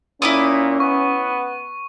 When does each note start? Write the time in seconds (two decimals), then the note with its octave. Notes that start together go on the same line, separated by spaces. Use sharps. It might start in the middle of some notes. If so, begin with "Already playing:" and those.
0.22 A#2 C#4 E4 D6 D#6
0.80 B3 C#6